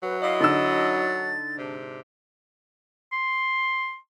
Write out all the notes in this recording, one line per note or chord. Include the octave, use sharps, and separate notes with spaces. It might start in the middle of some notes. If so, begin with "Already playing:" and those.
F#3 B4
E4 D#5 F5
D3 D#4 E6 A6
G#2 C3 D4
C6